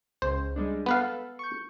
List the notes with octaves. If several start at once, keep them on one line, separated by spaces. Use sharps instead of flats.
C#2 C5
G3 G#3 D4
B3 A4 B4 F5 B5
C#6 G6